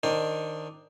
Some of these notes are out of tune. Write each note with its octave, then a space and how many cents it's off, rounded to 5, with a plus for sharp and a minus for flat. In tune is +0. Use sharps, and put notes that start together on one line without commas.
D#3 +0 D4 +0 C5 +20